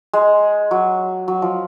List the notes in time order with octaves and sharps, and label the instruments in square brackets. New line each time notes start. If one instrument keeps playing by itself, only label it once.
[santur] G#3
F#3
F#3
F3